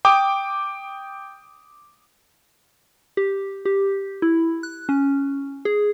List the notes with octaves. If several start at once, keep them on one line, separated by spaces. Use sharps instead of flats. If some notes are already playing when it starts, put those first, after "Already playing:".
G5 D6 D#6
G4
G4
E4
F#6
C#4
G#4